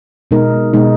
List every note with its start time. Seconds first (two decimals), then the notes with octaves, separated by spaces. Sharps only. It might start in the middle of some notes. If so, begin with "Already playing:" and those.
0.31 B2 G#3 D#4 A#4
0.74 B2 G#3 D#4